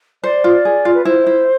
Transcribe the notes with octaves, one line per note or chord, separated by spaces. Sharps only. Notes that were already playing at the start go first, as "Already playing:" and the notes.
C5 D5
F4
G#4
F4
B4
E4 C5
E4